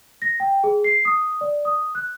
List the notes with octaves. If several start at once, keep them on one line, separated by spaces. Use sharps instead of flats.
A#6
G5
G#4
C7
D#6
D5
D#6
F#6